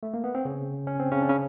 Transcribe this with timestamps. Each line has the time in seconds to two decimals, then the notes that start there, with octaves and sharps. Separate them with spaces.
0.03 A3
0.14 A#3
0.24 B3
0.35 C4
0.45 C#3 C#4
0.87 C#4
0.99 C4
1.11 C#3 C#4
1.22 D4
1.29 C#3 C#4